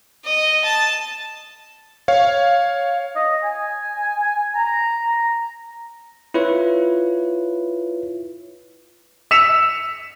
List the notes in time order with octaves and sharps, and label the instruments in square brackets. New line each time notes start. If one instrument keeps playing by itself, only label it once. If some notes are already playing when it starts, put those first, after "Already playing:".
[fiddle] D#5
A5
[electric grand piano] C#5 F5
[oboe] D#5
G#5
A#5
[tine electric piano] E4 F4 B4 C#5
[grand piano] E6 B6 C#7 E7 F7